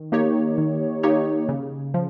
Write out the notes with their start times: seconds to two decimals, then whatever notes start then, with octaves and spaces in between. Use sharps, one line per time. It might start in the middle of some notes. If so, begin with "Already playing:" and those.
Already playing: D#3
0.12 A#3 D#4 G4 C#5
0.58 D#3
1.03 A#3 D#4 G4 C#5
1.49 C#3
1.94 F3